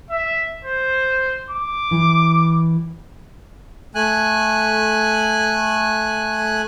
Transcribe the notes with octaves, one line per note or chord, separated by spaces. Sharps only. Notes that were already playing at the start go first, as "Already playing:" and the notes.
E5
C5
D6
E3
A3 G#5 F#6